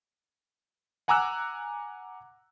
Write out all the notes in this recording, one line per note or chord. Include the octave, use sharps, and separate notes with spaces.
F#5 G#5 A#5 D6 E6 F#6